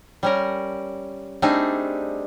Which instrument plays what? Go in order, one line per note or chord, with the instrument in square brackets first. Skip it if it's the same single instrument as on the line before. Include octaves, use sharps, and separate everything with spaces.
[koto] G3 C#4 A#4
G3 A3 C4 D4 D#4 G#4